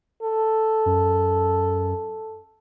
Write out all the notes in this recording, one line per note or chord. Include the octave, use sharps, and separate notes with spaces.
A4
F#2